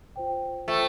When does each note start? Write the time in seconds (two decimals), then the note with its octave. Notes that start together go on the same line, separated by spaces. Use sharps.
0.16 F4 C5 G5
0.67 A3 F4 C5 G5